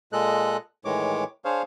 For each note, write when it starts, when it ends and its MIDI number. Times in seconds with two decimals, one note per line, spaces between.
0.13 0.57 46
0.13 0.57 56
0.13 0.57 69
0.13 0.57 75
0.13 0.57 90
0.85 1.24 45
0.85 1.24 51
0.85 1.24 52
0.85 1.24 56
0.85 1.24 73
0.85 1.24 86
1.45 1.62 62
1.45 1.62 68
1.45 1.62 72
1.45 1.62 73
1.45 1.62 77